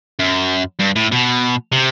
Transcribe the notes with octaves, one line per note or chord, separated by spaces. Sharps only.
F#2
G2
A2
B2
C3